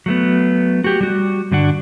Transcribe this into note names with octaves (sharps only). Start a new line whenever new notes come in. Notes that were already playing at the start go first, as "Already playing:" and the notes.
F#3 A3 B3
F#4 G4
G3 F#4
G2 D3 D4 F#4